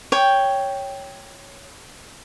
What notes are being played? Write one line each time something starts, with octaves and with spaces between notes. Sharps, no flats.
C#5 G5